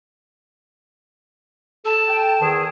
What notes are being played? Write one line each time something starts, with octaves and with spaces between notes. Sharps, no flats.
A4 A5
G5
E2 D#3 G#4